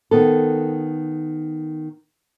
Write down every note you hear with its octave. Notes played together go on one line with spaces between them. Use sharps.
D#3 B3 A4